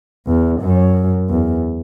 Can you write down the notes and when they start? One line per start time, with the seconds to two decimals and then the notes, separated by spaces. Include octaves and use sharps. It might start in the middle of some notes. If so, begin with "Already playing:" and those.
0.27 E2
0.61 F#2
1.30 E2